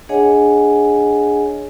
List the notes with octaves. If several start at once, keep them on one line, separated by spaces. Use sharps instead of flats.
D4 G#4 C#5 D#5 F#5 G#5